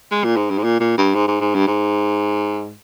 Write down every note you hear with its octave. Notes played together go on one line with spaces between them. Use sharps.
G#3
A#2
G#2
G2
G#2
A#2
A#2
G2
G#2
G#2
G#2
G2
G#2